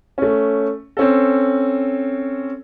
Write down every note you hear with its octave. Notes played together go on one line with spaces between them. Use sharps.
A3 C#4
C4 C#4 A4